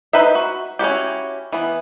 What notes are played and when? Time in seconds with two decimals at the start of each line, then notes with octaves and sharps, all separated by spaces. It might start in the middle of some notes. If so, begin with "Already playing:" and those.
0.13 D#4 B4 C5 E5
0.35 F#4
0.79 C#4 E4 F#4 G4
1.52 E3 B3